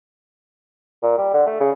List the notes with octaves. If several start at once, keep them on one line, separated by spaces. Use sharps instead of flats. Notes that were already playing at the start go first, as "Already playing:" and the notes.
A#2
G3
D3
A3
C#3